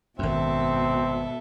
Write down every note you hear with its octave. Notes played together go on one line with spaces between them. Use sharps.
G#1 F#2 B2 C4 A4 E5